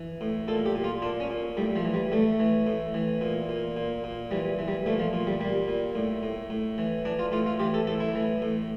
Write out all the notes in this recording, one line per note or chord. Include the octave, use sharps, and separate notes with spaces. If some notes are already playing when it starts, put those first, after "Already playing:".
Already playing: E3
A2
A#2 A4
G4
A#2
F4
A#2 D4
C#4
A#2
A2 G3
F3
E3
G3
A2 A3
E3
A2
E3
A#2
A#2
A#2
A#2
E3 G3
E3
G3
A#2 A3
F3
A#2
G3
A#2 G3
A#2
A2
A2
A2
E3
E3 D4
F4
A2 F4
F4
E3 G4
A4
A2 A4
E4
E3
A2